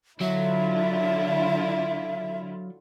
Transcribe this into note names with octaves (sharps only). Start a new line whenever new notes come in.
D3 F#3 E4 F4 E5